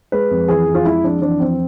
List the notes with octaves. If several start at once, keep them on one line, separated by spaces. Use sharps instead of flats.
G#3 B4
F2
E3 G#4
F2
F4
G#3 E4
F2 D4
E3 D4
F2 C4